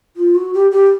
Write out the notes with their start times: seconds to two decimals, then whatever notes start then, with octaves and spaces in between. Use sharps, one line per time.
0.16 F4
0.35 F#4
0.54 G4
0.71 G4